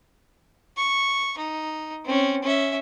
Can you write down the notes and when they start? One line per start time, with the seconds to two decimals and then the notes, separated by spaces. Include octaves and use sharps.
0.77 C#6
1.38 D#4
2.05 C4 C#4
2.42 C#4 E5